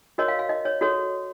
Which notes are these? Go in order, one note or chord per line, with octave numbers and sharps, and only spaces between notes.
F#4 A#4 C#5 D#5
F5
F5
D#5
C#5
F#4 A4 C#5